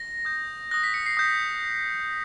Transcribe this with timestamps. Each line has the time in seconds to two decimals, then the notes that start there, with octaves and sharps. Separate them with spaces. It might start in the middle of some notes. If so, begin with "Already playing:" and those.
Already playing: A#6
0.25 D#6 G6
0.71 D#6 F#6 A#6
0.84 B6
0.94 C#7
1.06 C7
1.17 D#6 G6